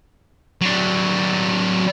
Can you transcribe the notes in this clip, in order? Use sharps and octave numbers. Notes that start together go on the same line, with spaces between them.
F#3 D4